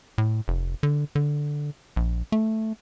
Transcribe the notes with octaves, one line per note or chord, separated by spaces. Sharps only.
A2
F1
D3
D3
A#1
A3